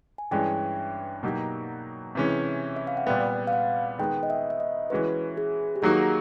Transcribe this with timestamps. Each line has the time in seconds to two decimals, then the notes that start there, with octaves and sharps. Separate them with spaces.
0.18 G#5
0.31 G2 E3 G#3 C#4 G5
1.23 B2 F#3 A#3 D#4 G4
2.15 C3 E3 G#3 C#4
2.76 E5
2.87 F5
2.97 F#5
3.07 A#2 G3 B3 G5
3.47 F5
3.53 F#5
3.99 D#3 G#3 B3 G5
4.23 D#5
4.30 E5
4.50 E5
4.60 D#5
4.90 E3 G#3 C#4 F#4 B4
5.37 G#4
5.76 G4
5.82 D#3 F#3 A#3 D#4 F#4 G#4